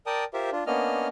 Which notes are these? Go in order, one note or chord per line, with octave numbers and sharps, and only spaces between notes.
A#4 D5 G5 A5 D#6
F4 G4 A#4 C5 E5
D4 F4
A#3 B3 C#4 D4 D#5 F6